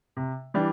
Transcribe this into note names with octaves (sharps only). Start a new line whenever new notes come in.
C3
E3 G3 D4